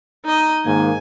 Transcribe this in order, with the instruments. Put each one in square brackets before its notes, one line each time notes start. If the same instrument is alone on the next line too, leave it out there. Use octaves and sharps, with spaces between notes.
[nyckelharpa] D#4 D#5
[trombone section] G#2 D#3 A#3 [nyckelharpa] G#5